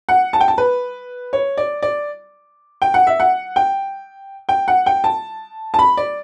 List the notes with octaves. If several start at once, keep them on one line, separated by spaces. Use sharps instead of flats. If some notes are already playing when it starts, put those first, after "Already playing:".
F#5
A5
G5
A5
B4
C#5
D5
D5
G5
F#5
E5
F#5
G5
G5
F#5
G5
A5
A5
B5
D5